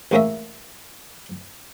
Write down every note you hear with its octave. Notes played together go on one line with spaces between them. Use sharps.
A1 G#3 A#3 C#4 A#4 E5